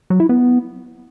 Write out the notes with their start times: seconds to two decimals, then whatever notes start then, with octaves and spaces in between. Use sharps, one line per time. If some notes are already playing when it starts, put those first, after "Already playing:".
0.10 F#3
0.20 E4
0.29 B3